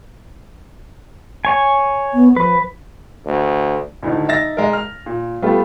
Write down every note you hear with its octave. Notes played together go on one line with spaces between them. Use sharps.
C#5 G#5
B3
F3 B4
D2
D2 A2 D3 D#3
D#4 E5 A6 A#6
G#3 A#4
F6
A#2
G3 A3 B3 F4 G4 A4